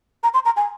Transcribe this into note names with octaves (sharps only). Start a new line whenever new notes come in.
A#5
C6
A#5
G#5